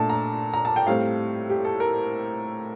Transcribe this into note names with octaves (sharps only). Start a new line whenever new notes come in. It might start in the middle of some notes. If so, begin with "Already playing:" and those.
Already playing: A#2 A3 D4 A5
A#5
A#5
A5
G5
A2 G3 C4 F5
G4
A4
A#4